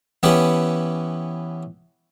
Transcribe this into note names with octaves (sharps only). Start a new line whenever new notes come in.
E3 B3 C#4 G4 B4